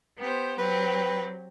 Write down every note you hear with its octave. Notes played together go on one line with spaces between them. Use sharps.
B3 G4 C5
F#3 C4 G4 B4